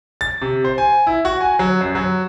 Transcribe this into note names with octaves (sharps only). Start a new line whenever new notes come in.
A6
C3
C5
G#5
E4
F#4
G#5
F#3
F#2
F#3